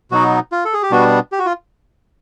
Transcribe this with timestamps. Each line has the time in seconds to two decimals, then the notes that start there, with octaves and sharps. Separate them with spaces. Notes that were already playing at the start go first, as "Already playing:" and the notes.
0.11 B2 F#3 B3 D#4 F#4
0.52 F4
0.65 A4
0.73 G#4
0.83 G4
0.91 B2 G3 B3 D4 F#4
1.32 G4
1.39 F#4
1.46 F4